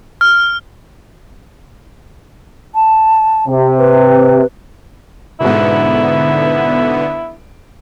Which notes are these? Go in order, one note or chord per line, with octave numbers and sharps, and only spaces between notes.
F6
A5
C3
B4
G#2 B2 D3 B3 E4